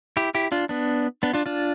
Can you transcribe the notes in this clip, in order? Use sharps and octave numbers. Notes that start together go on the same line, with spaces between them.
E4 G4
E4 G4
D4 F4
B3 D4
B3 D4
D4 F4
D4 F4